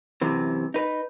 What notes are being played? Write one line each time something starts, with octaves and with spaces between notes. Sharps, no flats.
F#2 C3 E3
D#4 B4